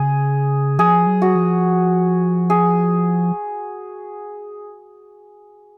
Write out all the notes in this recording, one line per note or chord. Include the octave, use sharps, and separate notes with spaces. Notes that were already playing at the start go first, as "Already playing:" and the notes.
Already playing: C#3 G#4
F3 G#4
F#3
F#4
F3
G#4